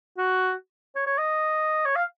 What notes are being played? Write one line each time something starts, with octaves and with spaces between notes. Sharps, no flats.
F#4
C#5
C#5
D#5
C#5
F5